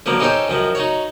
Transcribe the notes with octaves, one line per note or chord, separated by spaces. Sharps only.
D3 F3 F#3 A#3 B3
C#4 D#4 G4 A4 C5 C#5
F#2 D#3 F3
D#4 F#4 C#5